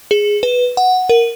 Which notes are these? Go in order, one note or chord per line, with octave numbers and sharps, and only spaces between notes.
G#4
B4
F#5
A#4